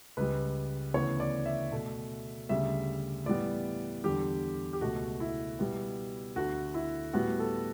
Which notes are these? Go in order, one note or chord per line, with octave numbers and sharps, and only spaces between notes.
C#2 C#3 G3 B4
D2 C#3 E3 B3 C#5
D5
E5
B2 A3
D2 C#3 G3 E5
A2 E3 G3 B3 D5
E2 D3 G3 G4
G4
C#2 B2 A3 F#4
E4
B2 G3 B3
D2 D3 A3 F#4
E4
A2 G3 B3 F#4
A4